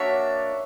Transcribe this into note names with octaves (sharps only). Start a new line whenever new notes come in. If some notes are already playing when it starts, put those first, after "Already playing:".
Already playing: A#3 D4 F#4 C#5 E5